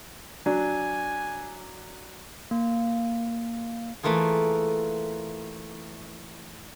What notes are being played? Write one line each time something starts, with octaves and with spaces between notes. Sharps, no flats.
F#3 D4 G#5
A#3
E3 A3 A#3 F4 G#4